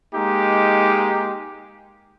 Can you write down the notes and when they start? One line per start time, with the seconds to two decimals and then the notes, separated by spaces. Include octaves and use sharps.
0.15 G#3 A#3 D#4 G4